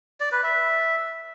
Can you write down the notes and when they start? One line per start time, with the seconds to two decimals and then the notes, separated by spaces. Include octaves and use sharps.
0.20 D5
0.32 B4
0.43 E5